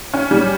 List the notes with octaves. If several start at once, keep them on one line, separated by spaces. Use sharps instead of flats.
C#4
G3